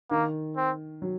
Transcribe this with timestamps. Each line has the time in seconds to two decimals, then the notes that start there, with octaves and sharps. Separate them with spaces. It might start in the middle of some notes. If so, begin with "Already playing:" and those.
0.11 D#3 A#3
0.57 C4
1.02 F#3